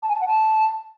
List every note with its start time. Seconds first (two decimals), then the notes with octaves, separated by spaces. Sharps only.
0.03 A5
0.09 G#5
0.15 A5
0.21 F#5
0.27 A5